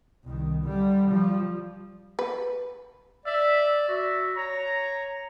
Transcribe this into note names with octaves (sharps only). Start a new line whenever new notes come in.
C2 D#3
D3 G3
F3 G3
B4
D5 E5
F#4 E5
C#5 A#5